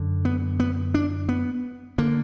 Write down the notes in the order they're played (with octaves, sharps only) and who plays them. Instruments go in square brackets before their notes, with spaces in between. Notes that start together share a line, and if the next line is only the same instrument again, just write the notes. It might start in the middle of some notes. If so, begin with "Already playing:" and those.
Already playing: [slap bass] F#2 D3
B3
B3
D4
B3
D3 A#3